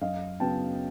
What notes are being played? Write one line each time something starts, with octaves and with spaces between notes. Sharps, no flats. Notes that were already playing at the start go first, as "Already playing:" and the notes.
F#2 D#5 F5
C#3 F#3 B3 G5 A5